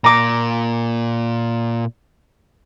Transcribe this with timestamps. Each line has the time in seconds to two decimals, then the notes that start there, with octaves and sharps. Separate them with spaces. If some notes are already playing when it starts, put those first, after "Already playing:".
0.04 A#2 A#5 D6